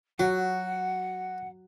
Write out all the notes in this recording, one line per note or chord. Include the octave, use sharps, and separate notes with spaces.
F#3 F#4 F#5